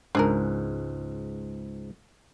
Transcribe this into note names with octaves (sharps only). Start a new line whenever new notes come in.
C#2 G#2 D4 G#4 A#4